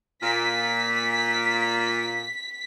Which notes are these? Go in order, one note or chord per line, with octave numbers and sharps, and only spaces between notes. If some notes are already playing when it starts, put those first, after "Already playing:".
A#2 B6